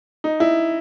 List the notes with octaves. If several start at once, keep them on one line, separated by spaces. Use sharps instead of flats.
D#4
E4